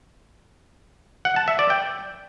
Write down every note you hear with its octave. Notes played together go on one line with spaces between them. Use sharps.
F#5
A5
E5
D5
G5